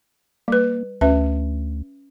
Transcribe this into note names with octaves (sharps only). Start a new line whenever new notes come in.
G3 A#3 B4
D2 C#4 B4 E5